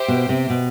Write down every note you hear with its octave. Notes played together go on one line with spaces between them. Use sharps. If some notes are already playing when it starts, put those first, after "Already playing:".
Already playing: G4 C5 E5 G5
B2
C3
B2